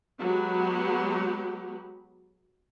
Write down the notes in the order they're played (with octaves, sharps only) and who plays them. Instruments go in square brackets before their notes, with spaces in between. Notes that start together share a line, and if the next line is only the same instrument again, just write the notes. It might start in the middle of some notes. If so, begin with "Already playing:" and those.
[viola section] F#3 G#3 B3 G4